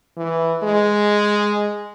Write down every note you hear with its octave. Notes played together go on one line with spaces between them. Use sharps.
E3
G#3